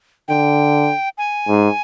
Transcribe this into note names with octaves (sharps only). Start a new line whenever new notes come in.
D3 G5
G#5
G#2